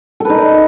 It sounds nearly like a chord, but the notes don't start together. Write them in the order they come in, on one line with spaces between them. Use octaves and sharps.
A4 B4 D#4